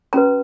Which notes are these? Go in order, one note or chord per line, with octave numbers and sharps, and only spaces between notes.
C#4 F#4 B4 A#5